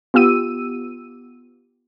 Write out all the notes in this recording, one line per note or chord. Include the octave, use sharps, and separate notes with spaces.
B3 F4 G4 E6 D#7